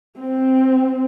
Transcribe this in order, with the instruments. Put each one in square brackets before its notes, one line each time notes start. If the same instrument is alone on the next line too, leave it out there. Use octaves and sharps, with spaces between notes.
[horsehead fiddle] C4